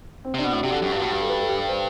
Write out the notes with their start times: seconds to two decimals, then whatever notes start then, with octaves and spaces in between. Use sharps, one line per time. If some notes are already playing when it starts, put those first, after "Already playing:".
0.25 C4
0.34 C3 D4
0.44 B2
0.53 A2 F#4
0.63 C3 G4
0.72 D3 A4
0.82 F#2 G4
0.92 G2 F#4
1.01 A2
1.11 G2 G4
1.21 A4
1.30 B4
1.40 A4
1.49 G4
1.60 B4
1.68 C5